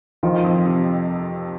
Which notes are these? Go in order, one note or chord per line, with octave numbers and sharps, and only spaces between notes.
D#3 F3 F4
F2
C3